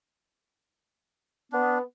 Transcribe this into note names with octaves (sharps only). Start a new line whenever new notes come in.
B3 D4